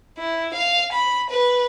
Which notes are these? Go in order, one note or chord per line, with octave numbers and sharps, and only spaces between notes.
E4
F5
B5
B4